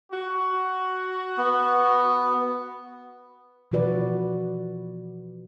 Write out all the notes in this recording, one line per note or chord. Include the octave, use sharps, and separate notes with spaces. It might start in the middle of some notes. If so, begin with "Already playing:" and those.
F#4
B3
B2 E3 F3 F#4 B4 D5